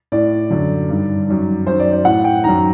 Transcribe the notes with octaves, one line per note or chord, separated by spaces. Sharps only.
A2 D5
F#2 D3
G2 D#3
F#2 D#3
F#2 D#3 C5
D5
D5
A2 F#5
G5
F#2 D#3 A#5